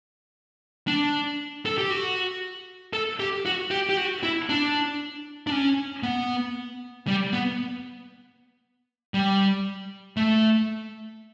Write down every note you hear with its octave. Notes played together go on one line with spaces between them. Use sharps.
D4
A4
G4
F#4
A4
G4
F#4
G4
G4
F#4
E4
D4
D4
C#4
B3
G3
B3
G3
A3